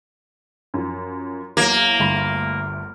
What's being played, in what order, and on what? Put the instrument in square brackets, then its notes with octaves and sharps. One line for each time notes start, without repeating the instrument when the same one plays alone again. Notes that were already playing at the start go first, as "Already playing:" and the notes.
[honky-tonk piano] F#2 F3
[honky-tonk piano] E2 F#3 [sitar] A#3
[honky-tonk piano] G1 D2 B5